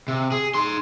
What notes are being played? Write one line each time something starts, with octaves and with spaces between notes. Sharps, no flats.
C3
G#4
D#4 C6